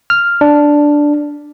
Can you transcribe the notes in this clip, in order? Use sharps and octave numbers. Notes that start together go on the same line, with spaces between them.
F6
D4